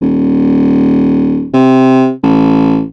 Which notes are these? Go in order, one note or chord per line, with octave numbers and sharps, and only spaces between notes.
D#1
C3
A1